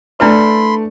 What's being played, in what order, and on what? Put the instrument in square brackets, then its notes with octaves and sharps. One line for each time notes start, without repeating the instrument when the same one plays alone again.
[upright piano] A3 D5 [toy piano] D4 E4 B4 [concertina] B5 C6